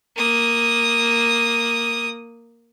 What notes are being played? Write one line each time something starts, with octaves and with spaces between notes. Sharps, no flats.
A#3 D#6